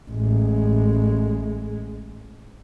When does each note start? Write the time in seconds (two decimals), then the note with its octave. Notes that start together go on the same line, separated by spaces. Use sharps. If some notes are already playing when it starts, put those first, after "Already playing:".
0.11 A1 G#3